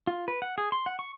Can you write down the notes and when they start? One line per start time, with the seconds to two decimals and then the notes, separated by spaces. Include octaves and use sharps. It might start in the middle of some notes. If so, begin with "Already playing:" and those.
0.07 F4
0.28 B4
0.42 F#5
0.58 G#4
0.72 C6
0.86 F#5
0.99 C#6